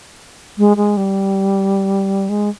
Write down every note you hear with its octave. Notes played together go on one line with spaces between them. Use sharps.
G#3
G#3
G3
G#3